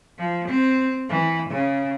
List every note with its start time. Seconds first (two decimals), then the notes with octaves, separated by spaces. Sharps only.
0.17 F3
0.48 C4
1.09 E3
1.49 C#3